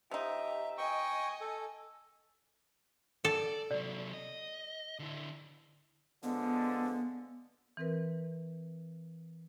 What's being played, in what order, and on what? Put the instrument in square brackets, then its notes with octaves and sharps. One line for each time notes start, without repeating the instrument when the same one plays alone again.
[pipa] F3 D#4 [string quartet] G4 [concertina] E5
[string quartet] D#5 G#5 [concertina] G5 C#6
[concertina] A4
[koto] A4 [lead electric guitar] D5
[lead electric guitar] C3 F#3 [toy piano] D5
[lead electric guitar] D#5
D3 E4
[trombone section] D3 F3 G#3 [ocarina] B3
[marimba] E3 C4 A#4 B4